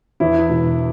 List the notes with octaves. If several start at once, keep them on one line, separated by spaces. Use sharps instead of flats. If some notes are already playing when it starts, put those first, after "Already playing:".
E2 E4
E1